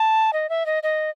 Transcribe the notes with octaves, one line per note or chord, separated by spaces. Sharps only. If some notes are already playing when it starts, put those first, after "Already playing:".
Already playing: A5
D#5
E5
D#5
D#5